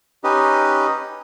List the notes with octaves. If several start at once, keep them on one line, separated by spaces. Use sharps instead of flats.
C#4 D#4 G4 B4 D#5